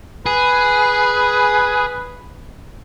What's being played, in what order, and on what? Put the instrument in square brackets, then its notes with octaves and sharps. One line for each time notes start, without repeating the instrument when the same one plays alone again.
[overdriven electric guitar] G#4 [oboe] B4